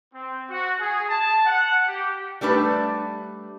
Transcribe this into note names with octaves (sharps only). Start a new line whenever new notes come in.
C4
F#4
G#4
A5
F#5
G4
G3 A3 D4 B4